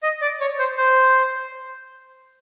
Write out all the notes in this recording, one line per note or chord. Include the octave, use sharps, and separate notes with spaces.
D#5
D5
C#5
C5
C5